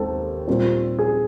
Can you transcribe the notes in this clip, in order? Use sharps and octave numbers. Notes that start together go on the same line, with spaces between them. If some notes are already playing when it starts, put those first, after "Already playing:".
Already playing: D#2 D#3 G#3 C4 A4 C5
A#2 G3 C4 F4
G#4